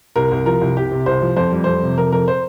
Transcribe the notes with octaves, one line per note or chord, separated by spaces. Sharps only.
C2 A#4
C2
F3 A#4
C2
C2 G4
C3
C2 C5
F3
F2 C5
G3
F2 C5
C3
F2 A#4
F2 A#4
C5